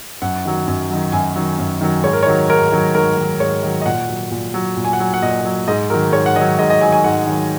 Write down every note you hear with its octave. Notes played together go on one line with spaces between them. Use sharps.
F#2 F#5
D#3 F#3
F#2
D#3 F#3
F#2 G#5
D#3 F#3
F#2
D#3 F#3
G#2 C#5
A#4
C#5
D#3 F#3
G#2 A#4
D#3 F#3
G#2 A#4
D#3 F#3
G#2 C#5
D#3 F#3
D#5
A#2 F#5
F#3
A#2
F#3
A#2
G#5
F#5
F#3 G#5
F#5
A#2 D#5
F#3
G#2 D#5
D#3 F#3 A#4
G#2 C#5
F#5
D#3 F#3 D#5
G#2 D#5
D#5
D#3 F#3 G#5
G#5
G#2 F#5
D#3 F#3